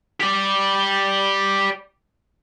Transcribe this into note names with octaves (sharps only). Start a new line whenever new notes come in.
G4 D5